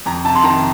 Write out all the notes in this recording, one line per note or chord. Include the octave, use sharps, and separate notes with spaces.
F2 A#5
C3 A5
C6
D#3 A#5